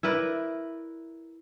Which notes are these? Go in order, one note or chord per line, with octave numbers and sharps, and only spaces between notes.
E4 A#4 B4 D5